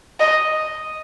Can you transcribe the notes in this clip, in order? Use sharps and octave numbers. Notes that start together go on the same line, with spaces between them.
D#5